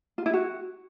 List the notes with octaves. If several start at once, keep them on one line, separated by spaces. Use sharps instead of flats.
F4
E4
F#4